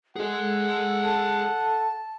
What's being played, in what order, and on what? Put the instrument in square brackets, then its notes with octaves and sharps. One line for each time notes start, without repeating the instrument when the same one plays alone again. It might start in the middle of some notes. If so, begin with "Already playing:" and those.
[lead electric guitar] G#4 D#5 [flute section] A4 [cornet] F#5
[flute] A5